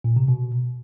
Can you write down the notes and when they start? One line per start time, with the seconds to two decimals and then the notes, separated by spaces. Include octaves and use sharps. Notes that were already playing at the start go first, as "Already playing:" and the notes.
0.04 A#2
0.16 C3
0.28 B2